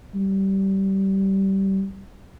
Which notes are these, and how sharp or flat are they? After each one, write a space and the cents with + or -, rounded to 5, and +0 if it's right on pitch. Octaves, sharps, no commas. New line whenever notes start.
G3 -20